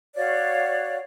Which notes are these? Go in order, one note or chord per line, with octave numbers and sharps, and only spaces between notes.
F#4 C#5 D5 F5